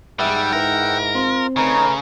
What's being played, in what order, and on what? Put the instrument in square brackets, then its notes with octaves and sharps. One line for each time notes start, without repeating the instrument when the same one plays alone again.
[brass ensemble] G#2 [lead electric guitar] G3 [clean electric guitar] G#4 B4 E5 [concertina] F#5 G5 E6
[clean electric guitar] E4 B4 [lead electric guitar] A#4
[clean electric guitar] C4 [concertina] F4
[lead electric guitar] C#3 [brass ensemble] A3 B4 A#5 [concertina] D#4 C#5